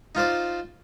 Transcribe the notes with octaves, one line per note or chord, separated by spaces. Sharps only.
D#4 F4 C5 D5